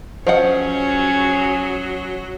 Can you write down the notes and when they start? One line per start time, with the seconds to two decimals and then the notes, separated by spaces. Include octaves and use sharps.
0.27 F3 F#3 C#4 G#4 C5 D#5 F#5